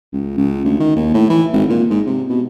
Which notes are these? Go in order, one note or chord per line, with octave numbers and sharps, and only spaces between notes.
C#2
C#2
D2
D#3
D#2
A2
E3
G#1
A#2
G#2
C3
B2